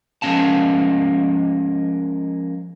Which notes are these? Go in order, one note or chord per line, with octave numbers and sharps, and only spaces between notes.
F3 G#3 A#3 C#4 F5 A5